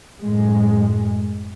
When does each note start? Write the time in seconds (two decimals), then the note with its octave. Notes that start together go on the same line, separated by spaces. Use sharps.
0.21 F#2 A2 G#3